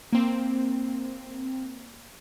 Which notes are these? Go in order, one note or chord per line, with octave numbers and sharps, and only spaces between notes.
A#3 C4